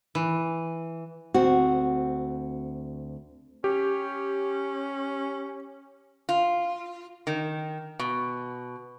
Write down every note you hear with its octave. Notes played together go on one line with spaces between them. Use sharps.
E3
D2 C4 F#4
C#4 G4
F4
D#3
B2